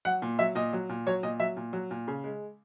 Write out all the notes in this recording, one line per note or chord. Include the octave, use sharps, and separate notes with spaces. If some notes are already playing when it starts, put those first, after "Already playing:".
F#3 F#5
A#2
F#3 E5
A#2 D#5
F#3
A#2
F#3 C#5
A#2 D#5
F#3 E5
A#2
F#3
A#2
C#3
G#3